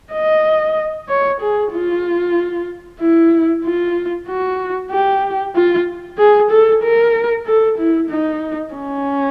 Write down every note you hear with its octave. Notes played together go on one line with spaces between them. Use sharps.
D#5
C#5
G#4
F4
E4
F4
F#4
G4
F4
G#4
A4
A#4
A4
E4
D#4
C#4